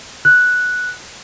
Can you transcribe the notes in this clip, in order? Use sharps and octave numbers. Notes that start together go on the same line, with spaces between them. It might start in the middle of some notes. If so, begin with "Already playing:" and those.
F#6